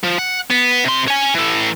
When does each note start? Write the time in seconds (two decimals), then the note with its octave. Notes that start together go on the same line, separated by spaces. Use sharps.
0.04 F3
0.19 F#5
0.51 B3
0.84 C3 C6
1.07 C#5 G#5
1.35 E3 A4